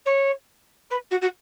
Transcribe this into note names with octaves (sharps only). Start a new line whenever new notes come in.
C#5
B4
F#4
F#4